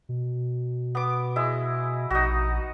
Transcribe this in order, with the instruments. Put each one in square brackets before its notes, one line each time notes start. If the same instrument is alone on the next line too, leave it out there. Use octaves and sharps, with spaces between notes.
[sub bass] B2
[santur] B3 D6
G#3 E4
[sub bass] A#1 [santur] D#4 F#4